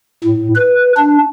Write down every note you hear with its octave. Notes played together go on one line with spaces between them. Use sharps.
A2
B4
D4